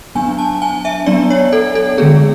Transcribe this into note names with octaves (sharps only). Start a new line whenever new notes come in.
F#3 B3 D4 G#5
A5
G#5
E5
F#3 B3 D4 D5
C#5
A4
A4
D3 G#3 B3 G#4